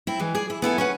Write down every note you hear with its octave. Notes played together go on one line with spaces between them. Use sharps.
C4 E4
E3 G#3
G#4 D5
E4
B3 E4 A4 G#5
C#4 B4 F#5